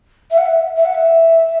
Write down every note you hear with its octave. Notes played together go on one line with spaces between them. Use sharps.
E5
F#5
E5
E5
F#5
E5